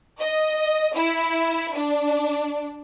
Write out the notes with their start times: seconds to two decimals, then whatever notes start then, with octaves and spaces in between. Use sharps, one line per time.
0.20 D#5
0.95 E4
1.74 D4